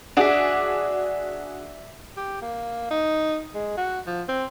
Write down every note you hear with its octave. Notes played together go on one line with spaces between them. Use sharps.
D4 F#4 G#4 D5 E5
G4
A#3
D#4
G#3
F#4
F3
C4